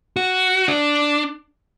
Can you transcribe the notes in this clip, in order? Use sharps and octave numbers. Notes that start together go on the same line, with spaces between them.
F#4
D4